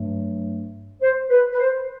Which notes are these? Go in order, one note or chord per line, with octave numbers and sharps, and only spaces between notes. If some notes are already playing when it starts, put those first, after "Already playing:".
Already playing: G2 F#3 A3
C5
B4
B4
C5